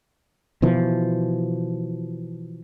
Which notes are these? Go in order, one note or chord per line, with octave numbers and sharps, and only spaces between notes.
B2 E3 F3